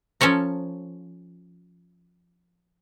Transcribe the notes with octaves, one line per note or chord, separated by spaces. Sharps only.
F3 C#4 A4 C#5 A#5